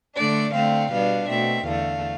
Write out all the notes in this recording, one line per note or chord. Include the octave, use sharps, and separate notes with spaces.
D3 A3 D4 D5
D3 A3 C4 F5
B2 G3 B3 D4 F5
B2 A3 C4 E5
E2 D3 A3 F5